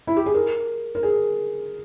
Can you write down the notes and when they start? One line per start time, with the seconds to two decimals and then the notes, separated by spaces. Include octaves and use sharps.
0.07 E4
0.17 G4
0.26 G#4
0.34 A#4
0.95 A#4
1.03 G#4